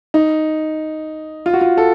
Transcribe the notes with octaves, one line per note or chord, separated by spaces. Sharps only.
D#4
F4
F#4
F4
A4